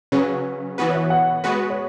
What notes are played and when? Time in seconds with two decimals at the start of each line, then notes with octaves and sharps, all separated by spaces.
0.12 C#3 F#3 C#4 B4
0.78 E3 B3 F#4 B4
0.90 C#5
0.95 E5
1.10 F#5
1.44 G#3 B3 F#4 B4
1.70 C#5